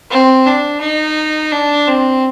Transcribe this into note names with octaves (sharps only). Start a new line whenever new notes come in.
C4
D4
D#4
D4
C4